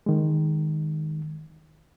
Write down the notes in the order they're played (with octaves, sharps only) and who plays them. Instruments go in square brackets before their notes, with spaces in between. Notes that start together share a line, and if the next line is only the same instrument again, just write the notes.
[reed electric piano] D#3 G#3